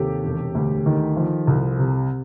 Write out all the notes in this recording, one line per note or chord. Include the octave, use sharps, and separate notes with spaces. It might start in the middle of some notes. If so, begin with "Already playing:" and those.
Already playing: D#2 C3 G4 A4
E1
D2
D#3
F3
C2
C3